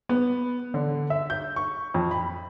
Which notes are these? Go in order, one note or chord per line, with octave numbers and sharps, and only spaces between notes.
B3
D3
E5
G6
C#6
F2
B5